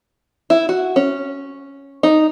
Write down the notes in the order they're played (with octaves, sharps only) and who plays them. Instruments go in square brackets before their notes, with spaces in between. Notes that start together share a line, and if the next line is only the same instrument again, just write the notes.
[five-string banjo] E4
F#4
C#4
D#4